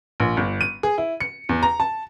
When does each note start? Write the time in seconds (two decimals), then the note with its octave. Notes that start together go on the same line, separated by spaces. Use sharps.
0.20 A#1
0.37 G1
0.61 D#7
0.83 G#4
0.98 E4
1.20 C#7
1.49 E2
1.63 A#5
1.80 A5